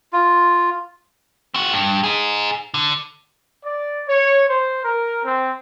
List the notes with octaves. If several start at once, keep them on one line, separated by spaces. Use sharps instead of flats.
F4
C4 F#4
G2
D#4 G#4
D3
D5
C#5
C5
A#4
C4